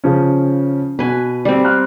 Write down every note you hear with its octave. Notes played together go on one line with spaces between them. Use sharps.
C#3 F3 C#4
B2 B4 G#5
G3 C4
C6 F6 F#6